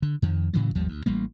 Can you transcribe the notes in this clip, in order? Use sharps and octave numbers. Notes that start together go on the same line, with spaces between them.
D3
F2 D#3
A2 C#3 E3 F#3
G#1 D#2 F3 G3
D2
A1 G3 A#3